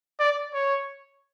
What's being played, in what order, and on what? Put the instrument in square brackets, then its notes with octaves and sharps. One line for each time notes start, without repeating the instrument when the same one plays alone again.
[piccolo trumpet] D5
C#5